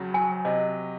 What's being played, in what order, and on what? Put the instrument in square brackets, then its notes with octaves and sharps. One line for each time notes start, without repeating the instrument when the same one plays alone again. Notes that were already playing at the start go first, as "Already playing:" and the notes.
Already playing: [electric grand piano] F2 C#3 F#3
[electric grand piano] F#3 [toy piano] G#5
[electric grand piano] C3 [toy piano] D#5